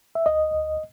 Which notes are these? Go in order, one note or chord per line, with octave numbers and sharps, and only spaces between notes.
E5
D2 D#5
D2